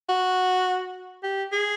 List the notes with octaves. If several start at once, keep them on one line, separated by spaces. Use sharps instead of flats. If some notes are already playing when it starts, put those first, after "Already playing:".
F#4
G4
G#4